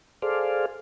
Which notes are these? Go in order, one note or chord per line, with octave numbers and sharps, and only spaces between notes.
G#4 A4 C5 D5 F5